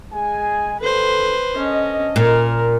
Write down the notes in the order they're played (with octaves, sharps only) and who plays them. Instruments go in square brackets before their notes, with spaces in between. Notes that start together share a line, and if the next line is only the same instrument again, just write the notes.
[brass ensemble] G#3 G#4 G#5
[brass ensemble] D#2 D#3 A4 [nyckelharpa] B4 C5
[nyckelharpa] C#4 [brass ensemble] D4 A4 D#5
[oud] A#2 [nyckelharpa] A#4